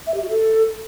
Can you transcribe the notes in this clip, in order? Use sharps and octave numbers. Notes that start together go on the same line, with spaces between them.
E5
G4
F#4
A4